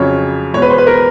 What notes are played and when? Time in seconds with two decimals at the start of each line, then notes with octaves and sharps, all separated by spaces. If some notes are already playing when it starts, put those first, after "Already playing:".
Already playing: F2 C#3 F#3 C#5
0.54 E2 B2 G#3 B3 C#5
0.62 B4
0.70 C5
0.78 B4
0.87 A#4